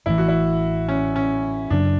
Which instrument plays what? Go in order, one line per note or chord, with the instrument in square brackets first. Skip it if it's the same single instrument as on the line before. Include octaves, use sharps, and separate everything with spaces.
[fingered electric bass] A1 A2 E3 [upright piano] E4
[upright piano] F#4
E4
C#4
C#4
[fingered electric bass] F#2 C#3 F#3 [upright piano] D4